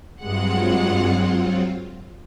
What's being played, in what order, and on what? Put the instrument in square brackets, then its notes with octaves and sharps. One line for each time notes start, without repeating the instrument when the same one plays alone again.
[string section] G2 G#3 F#5 [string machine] F#3 C4 F4